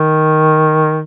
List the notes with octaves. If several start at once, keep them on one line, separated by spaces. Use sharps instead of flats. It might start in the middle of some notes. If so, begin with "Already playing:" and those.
Already playing: D#3